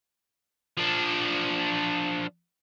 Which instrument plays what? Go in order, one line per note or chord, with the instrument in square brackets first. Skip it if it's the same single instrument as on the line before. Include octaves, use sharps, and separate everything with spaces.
[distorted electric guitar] F3 D4